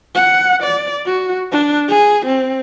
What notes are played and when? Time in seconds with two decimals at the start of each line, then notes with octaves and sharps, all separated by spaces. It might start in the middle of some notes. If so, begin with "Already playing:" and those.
0.15 F#5
0.63 D5
1.06 F#4
1.52 D4
1.88 G#4
2.26 C4